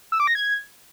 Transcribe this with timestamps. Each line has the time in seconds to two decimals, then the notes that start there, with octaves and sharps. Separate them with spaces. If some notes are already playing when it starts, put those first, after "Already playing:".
0.12 E6
0.20 D6
0.27 A#6
0.35 G#6